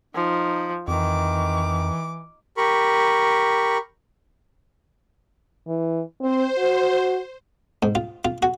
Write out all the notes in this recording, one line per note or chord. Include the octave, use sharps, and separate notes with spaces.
F3 D#4
F2 D#3 E3 D6
G4 A#4 B5 C#6
E3
C4 C5
F#4
G#2
F4
F4
F#4